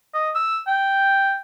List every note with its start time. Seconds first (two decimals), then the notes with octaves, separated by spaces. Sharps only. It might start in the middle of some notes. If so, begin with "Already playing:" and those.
0.14 D#5
0.35 E6
0.67 G5